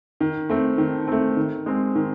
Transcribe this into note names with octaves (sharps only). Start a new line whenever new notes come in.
D#3
A3 C4
D#3
A3 C4
D#3
G#3 C4
D#3